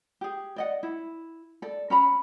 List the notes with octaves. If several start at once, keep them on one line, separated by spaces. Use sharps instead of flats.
G4 G#4
D5 D#5 F#5
E4
A4 D5
C#4 A#5 B5